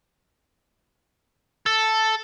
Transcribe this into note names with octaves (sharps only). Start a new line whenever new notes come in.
A4